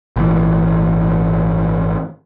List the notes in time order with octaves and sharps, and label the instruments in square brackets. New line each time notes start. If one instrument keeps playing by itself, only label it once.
[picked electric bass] G#1 A#2 E3